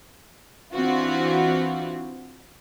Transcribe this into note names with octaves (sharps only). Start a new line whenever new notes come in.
E3 C4 D4 F4 F#4